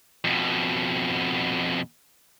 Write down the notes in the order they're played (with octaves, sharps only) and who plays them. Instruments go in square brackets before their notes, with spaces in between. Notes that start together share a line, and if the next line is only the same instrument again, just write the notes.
[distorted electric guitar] F2 B2